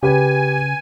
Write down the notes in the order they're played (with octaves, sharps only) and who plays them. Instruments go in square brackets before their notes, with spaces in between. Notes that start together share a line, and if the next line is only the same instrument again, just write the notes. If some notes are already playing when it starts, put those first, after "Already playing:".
[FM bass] C#3 [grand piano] G4 B4 [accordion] G#5